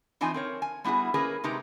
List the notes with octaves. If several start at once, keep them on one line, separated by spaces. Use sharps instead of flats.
E3 F3 C4 D#4 G#5
C4 A#4 C#5
G#5
G3 B3 E4 F#4 G#4
A#3 C#4 G#4 A#4 B4
C3 G#3 D#4 G4 B4 A#5